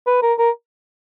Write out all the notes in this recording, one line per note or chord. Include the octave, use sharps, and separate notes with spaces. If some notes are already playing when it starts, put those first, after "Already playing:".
B4
A#4
A#4